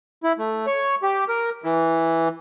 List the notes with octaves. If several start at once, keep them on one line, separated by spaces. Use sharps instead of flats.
E4
A3
C#5
G4
A#4
E3